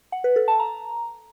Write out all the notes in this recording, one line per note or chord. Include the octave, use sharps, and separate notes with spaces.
F#5
B4
A4
A5
A#5